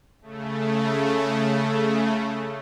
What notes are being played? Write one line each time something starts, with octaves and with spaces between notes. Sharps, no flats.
C#3 A3